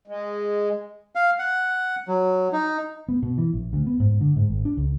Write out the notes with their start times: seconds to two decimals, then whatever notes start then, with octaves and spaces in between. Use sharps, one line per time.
0.07 G#3
1.15 F5
1.39 F#5
2.08 F#3
2.53 D#4
3.09 B3
3.22 B2
3.38 E3
3.53 A#1
3.73 D2
3.86 B3
4.00 G#2
4.21 D3
4.36 G#2
4.48 G#1
4.65 D4
4.77 C#2